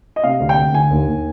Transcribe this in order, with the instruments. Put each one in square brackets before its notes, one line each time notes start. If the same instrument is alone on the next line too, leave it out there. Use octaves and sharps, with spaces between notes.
[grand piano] D#5
C3 F5
D2
G5
D2
D3 G#5
D#2
D#2